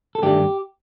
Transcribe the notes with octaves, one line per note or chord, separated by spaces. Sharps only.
A4
G2 D#3 A3 D4 G4